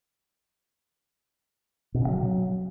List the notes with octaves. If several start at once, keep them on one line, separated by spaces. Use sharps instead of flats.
B2
C#3
F#3